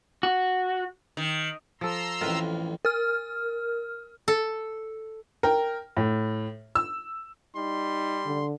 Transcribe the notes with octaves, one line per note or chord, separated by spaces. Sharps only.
F#4
D#3
F3 A4 A#5 C6 E6
A1 F2 F4 A#4 B4
A#4 F6
A4
A#4 G5
A2
E6
G3 D#4 C6
D3